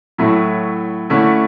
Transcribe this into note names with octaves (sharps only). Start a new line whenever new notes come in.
A2 F#3 A3 E4
D3 A3 C#4 E4